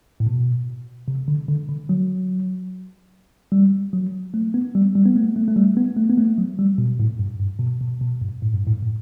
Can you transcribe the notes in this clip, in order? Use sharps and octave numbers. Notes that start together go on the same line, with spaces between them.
A2
B2
C3
D3
D3
D3
F#3
G3
F#3
A3
B3
G3
G3
B3
A3
A3
A3
G3
B3
A3
B3
A3
F#3
G3
B2
A2
G2
G2
B2
B2
B2
G2
A2
G2
A2
A2